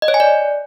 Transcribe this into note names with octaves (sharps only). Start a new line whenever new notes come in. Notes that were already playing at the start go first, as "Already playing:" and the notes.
D#5
C#5
G#5
D5